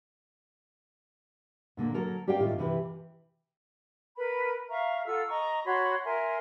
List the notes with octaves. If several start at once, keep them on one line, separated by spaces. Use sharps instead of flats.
A#2 D3 A#3
F#3 A4 A#4
C#4 G4 A#4 D5 F5 G5
A2 D#3 F4
C3 E3 G4 B4
A#4 B4 B5
E5 F5 A#5 C#6
F4 A4 F#5 E6
D#5 A#5 C#6
F#4 C#5 B5 C6
A#4 E5 G#5 C6